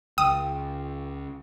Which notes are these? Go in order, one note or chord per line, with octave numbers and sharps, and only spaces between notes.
C#2 G5 D#6